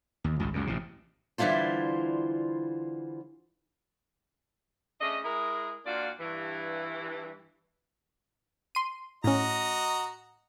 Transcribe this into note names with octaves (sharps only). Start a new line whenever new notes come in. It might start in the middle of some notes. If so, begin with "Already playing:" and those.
D#2
G#1 C#2
C#2 F#2
A1 C3
D3 E3 G3 E4 F4 C5
C#3 A3 D4 D#5
G#3 E4 G#4 A#4
A#2 D4 F4 F#4 D5
G2 E3
C6 D#7
A2 C#4 F#4 D#5 A#5